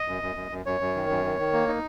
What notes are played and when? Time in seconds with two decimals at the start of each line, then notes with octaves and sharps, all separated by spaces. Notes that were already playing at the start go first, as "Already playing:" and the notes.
Already playing: D#5
0.08 F#2
0.22 F#2
0.36 F#2
0.51 F#2
0.66 F#2 C#5
0.81 F#2
0.95 D#3
1.10 F#2
1.25 D#3
1.39 D#3
1.53 A#3
1.68 D#4